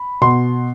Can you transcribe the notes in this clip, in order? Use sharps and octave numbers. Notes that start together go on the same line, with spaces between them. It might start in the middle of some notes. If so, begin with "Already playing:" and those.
Already playing: B5
B2 C6